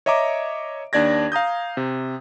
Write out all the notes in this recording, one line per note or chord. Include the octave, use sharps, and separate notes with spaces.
C#5 D#5 E5 A#5 D6
D#2 D4 D5 G#6 A#6
F5 A#5 D#6 G6
C3